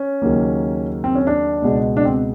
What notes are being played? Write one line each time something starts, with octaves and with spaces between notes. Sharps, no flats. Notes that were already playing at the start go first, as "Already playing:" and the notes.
Already playing: C#4
D#2 C#3 F#3 A#3
C4
C#4
D4
C#2 B2 G#3
D4
C4